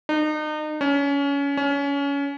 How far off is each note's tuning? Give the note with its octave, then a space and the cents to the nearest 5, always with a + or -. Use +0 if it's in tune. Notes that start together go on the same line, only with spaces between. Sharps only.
D#4 -35
C#4 +25
C#4 +25